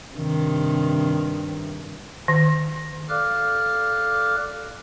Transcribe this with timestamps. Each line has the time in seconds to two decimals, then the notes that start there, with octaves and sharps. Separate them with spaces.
0.14 G2 C3 D#3
2.28 D#3
3.09 A4 D5 F5 D6 F6 F#6